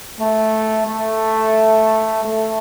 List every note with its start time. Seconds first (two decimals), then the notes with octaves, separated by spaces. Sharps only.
0.19 A3
0.87 A3
2.24 A3